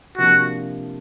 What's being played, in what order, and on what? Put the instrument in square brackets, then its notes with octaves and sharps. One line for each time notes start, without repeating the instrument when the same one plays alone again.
[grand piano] C3 F3 A#3 D4 [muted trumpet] F#4